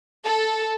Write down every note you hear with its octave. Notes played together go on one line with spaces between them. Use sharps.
A4